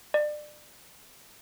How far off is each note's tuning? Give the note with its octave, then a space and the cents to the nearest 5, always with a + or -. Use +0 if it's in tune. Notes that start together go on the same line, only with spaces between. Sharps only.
D5 +25